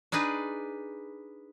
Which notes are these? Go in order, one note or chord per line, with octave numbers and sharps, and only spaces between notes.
D4 D#4 G#4 B4